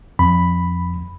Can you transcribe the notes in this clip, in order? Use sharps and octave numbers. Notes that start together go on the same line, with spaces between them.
F2 B5